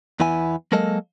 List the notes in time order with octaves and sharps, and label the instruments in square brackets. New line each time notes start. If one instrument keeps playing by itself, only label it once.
[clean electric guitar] E2 E3 B3 E4 G#5
F#3 G#3 A#3 A4 A#4 D#5